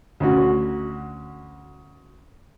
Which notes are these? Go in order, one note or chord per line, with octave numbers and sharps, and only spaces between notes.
D2 C#4 F#4